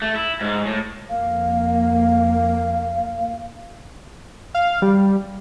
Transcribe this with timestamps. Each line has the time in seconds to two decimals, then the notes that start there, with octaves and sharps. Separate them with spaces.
0.02 A3
0.16 E4
0.41 G#2
0.66 A2
1.10 F2 A#3 F5
4.55 F5
4.82 G3